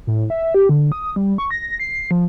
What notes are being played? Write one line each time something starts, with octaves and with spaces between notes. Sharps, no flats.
A2
E5
G4
D3
D#6
G3
C#6
A#6
C7
F3